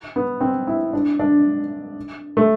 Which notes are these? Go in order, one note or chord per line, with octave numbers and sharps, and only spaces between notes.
B3
C4
E4
D4
D4
A3